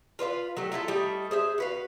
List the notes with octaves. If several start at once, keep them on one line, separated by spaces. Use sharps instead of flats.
F4 B4 C#5 F5
F#3 A3 G4
E4 F4 G#4 A4
G3 A3 D#4
G#4 C5 E5
F#4 B4 F5